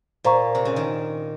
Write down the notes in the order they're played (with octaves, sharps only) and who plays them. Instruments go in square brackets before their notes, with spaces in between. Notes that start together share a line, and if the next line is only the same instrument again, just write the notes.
[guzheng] A#2 [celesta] C5 F5 A#5 C#6
[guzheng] C3
C#3
D#3